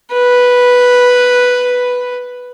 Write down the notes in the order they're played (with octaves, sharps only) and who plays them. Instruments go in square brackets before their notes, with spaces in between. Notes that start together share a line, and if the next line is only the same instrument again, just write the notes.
[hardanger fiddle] B4